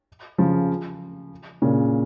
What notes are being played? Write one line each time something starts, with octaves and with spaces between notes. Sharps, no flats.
C#3 F3
A#2 C#3